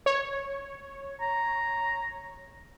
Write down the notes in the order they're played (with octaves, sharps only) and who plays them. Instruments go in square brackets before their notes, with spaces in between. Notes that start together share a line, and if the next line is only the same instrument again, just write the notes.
[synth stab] C#5
[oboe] A#5